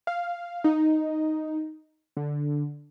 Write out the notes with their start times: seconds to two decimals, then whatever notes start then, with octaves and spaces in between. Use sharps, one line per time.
0.07 F5
0.64 D#4
2.17 D3